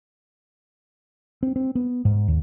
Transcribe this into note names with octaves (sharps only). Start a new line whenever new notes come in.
C4
C4
B3
G#2
D#2